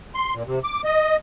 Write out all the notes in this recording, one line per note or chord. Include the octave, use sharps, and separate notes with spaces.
C6
A#2
C3
D6
D#5